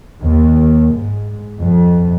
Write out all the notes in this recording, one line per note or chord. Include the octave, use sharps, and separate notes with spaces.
D#2
G#2
F2